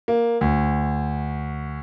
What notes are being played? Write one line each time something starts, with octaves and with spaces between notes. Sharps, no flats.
A#3
D2